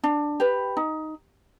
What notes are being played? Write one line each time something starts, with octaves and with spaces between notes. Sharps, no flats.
D4
G4 B4
D#4